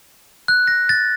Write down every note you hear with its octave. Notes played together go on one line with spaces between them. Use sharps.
F#6
A#6
A6